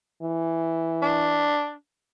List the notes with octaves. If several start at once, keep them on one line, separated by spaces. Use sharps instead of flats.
E3
D4